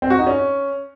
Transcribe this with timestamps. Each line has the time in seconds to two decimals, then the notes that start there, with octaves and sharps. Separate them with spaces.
0.02 C4
0.10 F#4
0.19 D#4
0.27 C#4